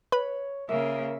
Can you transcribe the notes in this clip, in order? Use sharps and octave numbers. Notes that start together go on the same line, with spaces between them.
B4 C#5 B5
C#3 A#3 A#4 E5